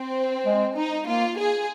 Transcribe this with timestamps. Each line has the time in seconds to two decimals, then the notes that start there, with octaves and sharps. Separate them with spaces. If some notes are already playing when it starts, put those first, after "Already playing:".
Already playing: C4
0.46 G#3
0.77 D#4
1.06 A#3 F4
1.38 G#4